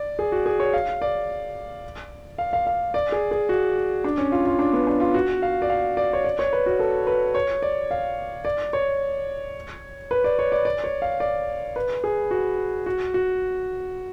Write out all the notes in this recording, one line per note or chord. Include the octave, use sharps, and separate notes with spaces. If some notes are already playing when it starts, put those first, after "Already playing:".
Already playing: D5
G#4
F#4
G#4
C#5
F5
D5
F5
F5
F5
D5
G#4
G#4
F#4
D4
C#4
F4
F4
D4
B3
D4
F4
F#4
F5
D5
F5
D5
C#5
D5
C#5
B4
F#4
A4
B4
C#5
D5
F5
D5
C#5
B4
D5
C#5
D5
D5
C#5
F5
D5
B4
G#4
F#4
F#4
F#4